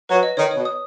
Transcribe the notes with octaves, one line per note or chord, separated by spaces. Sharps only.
F#3 B4
D#5
D#3 C#5
B2 C#5
D#6